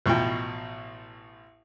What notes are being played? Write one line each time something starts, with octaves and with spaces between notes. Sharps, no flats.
A1 B2 F3 G5